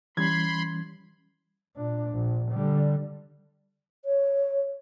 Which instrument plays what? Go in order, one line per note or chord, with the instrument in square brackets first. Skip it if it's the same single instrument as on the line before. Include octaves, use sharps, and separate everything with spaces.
[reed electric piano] E3 G3 C#4 [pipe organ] B5 C6 [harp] G#6
[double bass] A#2 D4
A#1
D3 G3
[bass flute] C#5